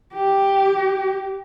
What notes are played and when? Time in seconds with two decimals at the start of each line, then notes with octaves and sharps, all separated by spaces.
0.14 G4